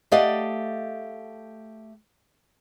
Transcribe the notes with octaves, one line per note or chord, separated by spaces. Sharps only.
A3 G4 D5 D#5 F5 F#5